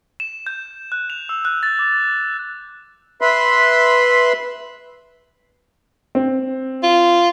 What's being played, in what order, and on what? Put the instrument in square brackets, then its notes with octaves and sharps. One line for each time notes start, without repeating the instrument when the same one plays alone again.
[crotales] E7
G6
F#6
F7
E6
F#6
A6
D6
[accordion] B4 E5 B5 C6
[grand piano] C4
[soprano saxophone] F4